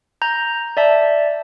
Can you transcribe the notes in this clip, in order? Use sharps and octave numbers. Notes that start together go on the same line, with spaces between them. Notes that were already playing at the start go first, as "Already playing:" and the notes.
A#5 G6
D5 E5 A5